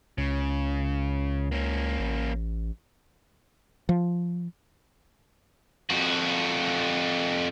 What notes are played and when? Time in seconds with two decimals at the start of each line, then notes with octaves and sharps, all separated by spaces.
0.18 C#2 C#3
1.52 A#3 C#4
1.99 A1
3.89 F3
5.90 F2 F#4